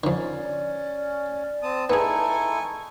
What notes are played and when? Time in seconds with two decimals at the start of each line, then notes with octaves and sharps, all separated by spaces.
0.04 F2 D3 C#4 D5
1.63 C4 A5 D#6
1.90 B3 D#4 E4 G#4 A4 G#5 C#6